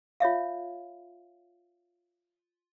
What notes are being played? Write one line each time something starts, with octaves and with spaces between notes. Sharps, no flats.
F4 C#5 E5 F5